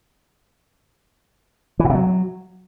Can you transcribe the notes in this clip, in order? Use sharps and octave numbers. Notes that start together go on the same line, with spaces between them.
E3
A2
C3
F#3